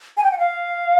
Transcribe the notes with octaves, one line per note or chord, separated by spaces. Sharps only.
G#5
G5
F#5
F5